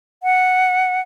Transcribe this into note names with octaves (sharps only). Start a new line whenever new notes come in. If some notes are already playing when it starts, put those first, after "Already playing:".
F#5